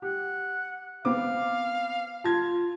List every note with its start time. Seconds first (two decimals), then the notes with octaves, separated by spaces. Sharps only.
0.02 G4 F#5
1.05 B3 C4 F5 D6
2.24 F4 A5 G#6